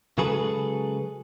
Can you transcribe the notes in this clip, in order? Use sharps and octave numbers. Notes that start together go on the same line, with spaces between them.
C#3 F#3 G#3 G#4 A4 B4